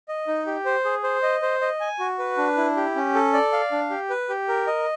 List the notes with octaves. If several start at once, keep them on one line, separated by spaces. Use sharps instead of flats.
D#5
D#4
G4
C5
G#4
C5
D#5
C5
D#5
G#5
F#4
B4
D4
E4
G4
C#4
A4
D5
F5
D4
G4
B4
G4
A#4
D#5